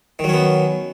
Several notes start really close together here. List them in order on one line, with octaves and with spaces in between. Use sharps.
D#3 F#3 C#4 B3